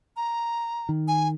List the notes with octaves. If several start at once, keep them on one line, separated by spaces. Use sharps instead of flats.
A#5
D#3
G#5